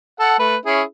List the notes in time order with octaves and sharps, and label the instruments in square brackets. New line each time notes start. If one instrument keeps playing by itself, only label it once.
[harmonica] A4 F#5
A3 B4
C#4 E4 G#4